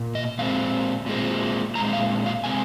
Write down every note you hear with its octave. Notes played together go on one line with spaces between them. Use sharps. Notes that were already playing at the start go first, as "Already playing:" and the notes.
Already playing: A#2
D#5
A#2 G#3 C4 F5
A#2 G#3 C4
A#2 G#3 C4 A#5
F5
F5
C3 G#3 C4 G#5